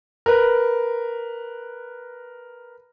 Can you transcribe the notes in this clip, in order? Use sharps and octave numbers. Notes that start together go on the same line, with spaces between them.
A#4 B4